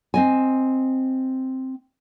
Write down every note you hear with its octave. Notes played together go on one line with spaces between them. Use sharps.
C4 D#5 G#5